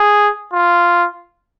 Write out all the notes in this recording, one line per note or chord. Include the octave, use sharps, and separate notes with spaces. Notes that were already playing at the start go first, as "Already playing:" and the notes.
Already playing: G#4
F4